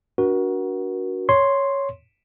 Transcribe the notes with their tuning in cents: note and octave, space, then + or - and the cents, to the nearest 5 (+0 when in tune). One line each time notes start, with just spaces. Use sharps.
D4 -25 F#4 +5 A#4 +35
C#5 +0 C6 +0